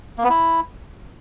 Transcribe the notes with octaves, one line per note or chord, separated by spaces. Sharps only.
A#3
B3
E4